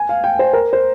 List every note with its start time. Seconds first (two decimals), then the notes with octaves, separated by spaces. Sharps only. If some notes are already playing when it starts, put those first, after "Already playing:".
Already playing: G#5
0.09 F5
0.24 G5
0.39 C5
0.53 A#4
0.73 C5